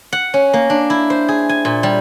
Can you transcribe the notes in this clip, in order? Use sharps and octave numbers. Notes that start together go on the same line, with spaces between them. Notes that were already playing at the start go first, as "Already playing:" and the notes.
F#5
C#4
A#3
D4
E4
C5
G#4
G#5
A#2
G3